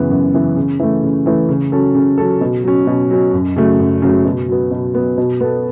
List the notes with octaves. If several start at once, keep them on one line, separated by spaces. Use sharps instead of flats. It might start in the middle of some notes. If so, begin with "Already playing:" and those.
Already playing: F#2 C#3 E3 B3
F#2
C#3 E3 B3
C#3
E3 A3
C#3
E3 A3
C#3
F#3 C#4 A4
C#3
F#3 C#4 A4
B2
F#3 C#4
B2
F#3 C#4
F#2
C#3 F#3 A3
F#2
C#3 F#3 A3
B2
F#3 B3
B2
F#3 B3
B2
B3 A4